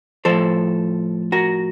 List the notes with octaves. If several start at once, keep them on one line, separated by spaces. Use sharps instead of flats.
A2 F3 A4 C5
F#4 A#4